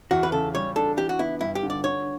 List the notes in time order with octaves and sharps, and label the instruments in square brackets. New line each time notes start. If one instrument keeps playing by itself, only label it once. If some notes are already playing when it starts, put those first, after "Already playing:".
[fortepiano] E2 [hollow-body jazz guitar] F#4
[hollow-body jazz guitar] B4
[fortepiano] C#3 [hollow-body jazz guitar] A4
[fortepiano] G3 [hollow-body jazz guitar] C#5
[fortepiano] D4 [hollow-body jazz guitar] A4
[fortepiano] E3 [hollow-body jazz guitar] G4
[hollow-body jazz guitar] F#4
[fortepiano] B3 [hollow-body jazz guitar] E4
[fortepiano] G2 [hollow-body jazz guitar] E4
[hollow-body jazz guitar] G4
[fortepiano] D3
[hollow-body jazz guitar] D5
[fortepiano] D3 [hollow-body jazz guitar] C#5